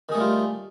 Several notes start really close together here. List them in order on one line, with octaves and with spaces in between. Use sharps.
D#3 G#4 A3 G3 F4